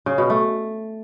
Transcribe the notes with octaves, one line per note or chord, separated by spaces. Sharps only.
C#3
B2
A3